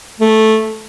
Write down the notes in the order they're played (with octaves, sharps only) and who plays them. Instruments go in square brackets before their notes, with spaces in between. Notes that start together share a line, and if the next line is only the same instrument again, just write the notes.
[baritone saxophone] A3